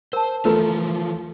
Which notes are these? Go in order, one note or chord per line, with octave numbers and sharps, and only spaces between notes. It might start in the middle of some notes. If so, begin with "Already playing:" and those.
A#4 C5 A5
E3 F3 A3 F4 A#4 B4 A#5